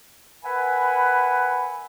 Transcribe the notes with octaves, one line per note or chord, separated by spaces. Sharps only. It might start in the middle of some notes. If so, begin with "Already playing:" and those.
A#4 B4 E5 F#5 G#5 B5